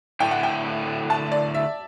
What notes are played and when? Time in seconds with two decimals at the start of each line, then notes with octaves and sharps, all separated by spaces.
0.20 D3 A3 E4 G5
0.31 F#5
0.43 G5
1.10 A5
1.32 D5
1.55 E5